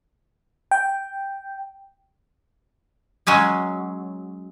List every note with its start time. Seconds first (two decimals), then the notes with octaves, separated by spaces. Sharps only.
0.71 G5
3.27 F#3 G#3 C#4 G#4